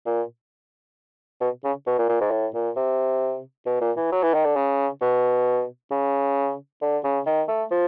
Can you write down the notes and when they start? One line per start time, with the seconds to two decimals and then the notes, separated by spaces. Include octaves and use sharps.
0.06 A#2
1.41 B2
1.64 C#3
1.87 B2
1.98 A#2
2.09 A#2
2.21 G#2
2.31 A2
2.54 A#2
2.76 C3
3.66 B2
3.81 A#2
3.97 E3
4.12 F#3
4.23 E3
4.34 D#3
4.45 D3
4.56 C#3
5.01 B2
5.91 C#3
6.82 D3
7.04 C#3
7.26 D#3
7.48 A3
7.71 F3